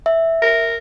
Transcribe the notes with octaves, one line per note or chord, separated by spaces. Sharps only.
E5
A#4